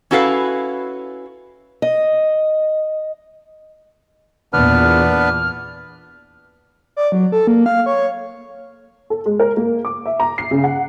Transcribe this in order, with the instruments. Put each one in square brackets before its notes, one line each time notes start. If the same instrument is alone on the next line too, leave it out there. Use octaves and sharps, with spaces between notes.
[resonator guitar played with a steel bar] C#4 E4 F#4 A4 B4 F5
[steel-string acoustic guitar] D#5
[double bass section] E2 A#2 [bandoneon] B3 D4 B4 [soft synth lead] F6
[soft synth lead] D5
F#3
A4
A#3
F5
C#5
[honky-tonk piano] A4
G#3
A#4
A#3
D6
E5
A#5
C7
C#3
F#5